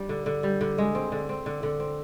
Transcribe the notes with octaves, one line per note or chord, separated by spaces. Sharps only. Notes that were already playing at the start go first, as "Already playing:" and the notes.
Already playing: G3 D4
D3
D3
G3
D3
G#3
C4
D3
C4
D3
D3
C4